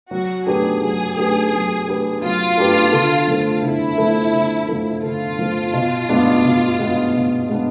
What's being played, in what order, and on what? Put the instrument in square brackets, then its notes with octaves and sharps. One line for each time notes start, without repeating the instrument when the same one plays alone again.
[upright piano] F#3 [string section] F#4
[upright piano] A3 D4 G4 B4 [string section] G#4
[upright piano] F#3 [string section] G#4
[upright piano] A3 D4 G4 B4
F#3
A3 D4 G4 B4
[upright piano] F#3 [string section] F4
[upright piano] A3 D4 G4 B4
D3
F3 A3
[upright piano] D3 [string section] E4
[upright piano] F3 A3
D3
F3 A3
[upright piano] D3 [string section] F4
[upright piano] F3 A3
B2
G#3 B3 D4
B2
G#3 B3 D4
B2
G#3 B3 D4